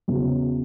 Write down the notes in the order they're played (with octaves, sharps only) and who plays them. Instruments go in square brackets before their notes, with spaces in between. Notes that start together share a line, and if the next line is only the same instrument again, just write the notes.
[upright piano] E2 C#3 F#3